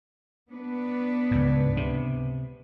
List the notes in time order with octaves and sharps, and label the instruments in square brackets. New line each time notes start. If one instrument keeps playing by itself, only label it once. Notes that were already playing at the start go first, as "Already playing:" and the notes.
[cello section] B3 D4 B4
[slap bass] C#2 G#2
C3